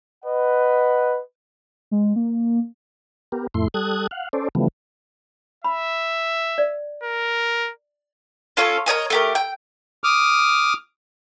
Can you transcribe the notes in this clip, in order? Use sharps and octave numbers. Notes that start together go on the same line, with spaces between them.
B4 D#5 F#5
G#3
A#3
B3 G4 A#4
F2 A2 A3 E4 C6
G3 A4 D#6 F#6 G#6
F5 F#5
C#4 A4 C5 D5
C#3 E3 F3 G3 A3 B3
E5 B5
D5
A#4
C#4 F4 A4 C#5
A#4 C#5 D#5 G#5
A3 G4 A#4
G5
D6 D#6 F6